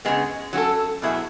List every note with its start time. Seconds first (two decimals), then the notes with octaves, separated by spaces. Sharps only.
0.05 C#3 G#3 B3
0.53 F#3 C#4 F#4 A4
1.02 B2 F#3 B3 E4 G#4